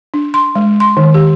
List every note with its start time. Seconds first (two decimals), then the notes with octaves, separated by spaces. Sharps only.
0.14 D4
0.34 C6
0.55 G#3
0.80 C6
0.97 D#3
1.14 G4